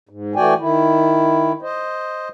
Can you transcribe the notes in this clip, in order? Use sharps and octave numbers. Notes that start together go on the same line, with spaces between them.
G#2
E3 A3 F#4 D5 G5 G#5
D#3 E4
C5 D#5